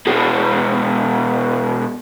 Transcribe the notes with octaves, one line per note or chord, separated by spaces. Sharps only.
B2 G#3